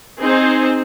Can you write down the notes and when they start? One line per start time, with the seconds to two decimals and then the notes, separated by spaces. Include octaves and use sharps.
0.18 C4 D#4 G#4 C5